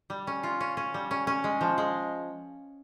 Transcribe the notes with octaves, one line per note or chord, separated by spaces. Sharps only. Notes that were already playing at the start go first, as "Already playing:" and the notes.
G3
C#4
F4
C#4
C#4
G3
C#4
C#4
G#3
F3
G#3